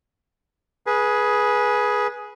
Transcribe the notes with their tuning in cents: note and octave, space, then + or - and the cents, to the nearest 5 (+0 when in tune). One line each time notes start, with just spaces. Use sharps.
G#4 +10 B4 -20